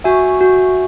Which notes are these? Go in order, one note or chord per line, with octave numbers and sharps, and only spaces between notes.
F#4 E5 G#5
F#4